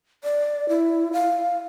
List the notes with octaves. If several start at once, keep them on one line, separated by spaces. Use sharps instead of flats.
D5
E4
F5